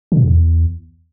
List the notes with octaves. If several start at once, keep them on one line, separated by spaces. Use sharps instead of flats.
D3
A#2
F#2
E2